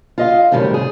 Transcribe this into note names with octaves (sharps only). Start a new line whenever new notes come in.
F4 D#5 F5
F#2 A2 C3 D#3 G3
G#4